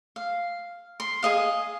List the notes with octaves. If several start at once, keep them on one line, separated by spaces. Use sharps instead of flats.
F5
C6
G#4 D#5 F5